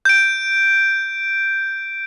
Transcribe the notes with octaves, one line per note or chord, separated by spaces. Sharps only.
G6 D7